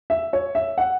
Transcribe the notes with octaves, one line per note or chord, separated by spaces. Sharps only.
E5
C#5
E5
F#5